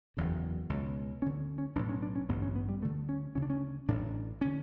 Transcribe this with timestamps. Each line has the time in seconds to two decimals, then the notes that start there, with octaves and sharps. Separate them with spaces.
0.17 F#1 E2 C#3
0.70 C#2 B2
1.22 D2 D3 C#4
1.58 C#4
1.76 B1 D4
1.79 A2
1.89 C#4
2.02 D4
2.15 C#4
2.29 A1 G2 D3 B3
2.42 C#4
2.56 B3
2.69 G3
2.82 D2 D3 A3
3.09 C#4
3.35 D2 C#3 C#4
3.42 D4
3.50 C#4
3.88 A1 A2 D4
4.41 D3 C#4